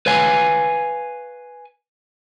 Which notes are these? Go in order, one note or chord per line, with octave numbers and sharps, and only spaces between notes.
B4 C#5 F5 G#5